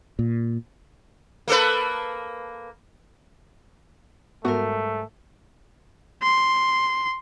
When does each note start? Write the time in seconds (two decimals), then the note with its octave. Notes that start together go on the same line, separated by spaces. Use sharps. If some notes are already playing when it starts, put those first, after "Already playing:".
0.19 A#2
1.48 A#3 A4 B4
4.45 G#2 G3 A3 B3 F#4 A#4 F#5
6.23 C6